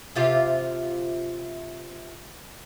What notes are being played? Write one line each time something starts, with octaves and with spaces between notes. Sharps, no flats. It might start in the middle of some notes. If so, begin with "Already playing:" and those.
C3 F4 G4